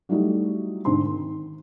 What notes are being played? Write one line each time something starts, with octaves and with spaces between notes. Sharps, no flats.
F#3 G3 A3 D#4 E4 F#4
G#2 D3 C4 C6
D#3